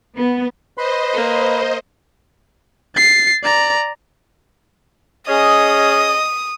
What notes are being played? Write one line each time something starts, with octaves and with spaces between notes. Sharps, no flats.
B3
B4 C5 D#5 B5 C6
A#3
A6 C7
D5 A#5
C#4 G#4 D#5 D#6